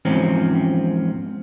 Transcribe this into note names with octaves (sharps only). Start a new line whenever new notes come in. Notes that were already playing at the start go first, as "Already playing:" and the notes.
E2 G#2 F3 C4 C#4